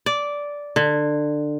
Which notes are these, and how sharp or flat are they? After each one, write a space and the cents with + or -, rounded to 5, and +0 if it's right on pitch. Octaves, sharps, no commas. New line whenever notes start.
D5 -10
D3 +20